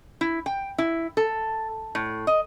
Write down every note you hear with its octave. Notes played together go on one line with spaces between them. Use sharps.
E4
G5
E4
A4
A2
D#5